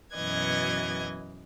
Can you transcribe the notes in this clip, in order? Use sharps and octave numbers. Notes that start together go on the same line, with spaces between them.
F#2 B2 E3 D#5 G#6